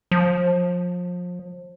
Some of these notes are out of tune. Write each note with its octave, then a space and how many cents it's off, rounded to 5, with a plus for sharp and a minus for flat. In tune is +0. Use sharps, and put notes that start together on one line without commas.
F3 +30